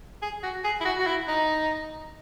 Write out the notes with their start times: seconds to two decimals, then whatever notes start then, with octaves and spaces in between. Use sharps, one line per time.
0.22 G#4
0.43 F#4
0.64 G#4
0.81 E4
0.85 F#4
0.99 F#4
1.07 E4
1.28 D#4